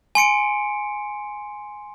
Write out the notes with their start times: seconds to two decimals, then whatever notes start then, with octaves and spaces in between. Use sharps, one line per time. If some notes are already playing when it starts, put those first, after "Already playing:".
0.15 G#5 C6 C#7 D7